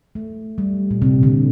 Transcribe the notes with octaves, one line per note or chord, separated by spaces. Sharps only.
A3
G3
A#2
C3
D3